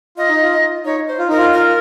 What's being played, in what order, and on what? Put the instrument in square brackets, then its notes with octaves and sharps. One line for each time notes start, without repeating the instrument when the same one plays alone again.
[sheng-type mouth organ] F4 [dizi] D#5
[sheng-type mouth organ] D#4
F4
[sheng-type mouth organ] D#4 [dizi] C#5
[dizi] C5
[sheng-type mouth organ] F4
[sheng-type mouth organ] D#4 [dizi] A#4
[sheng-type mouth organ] F4
[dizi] A#4